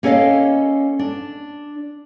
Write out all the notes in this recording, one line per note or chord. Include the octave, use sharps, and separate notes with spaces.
A#3 C#4 A4 C#5 D#5 F5
D4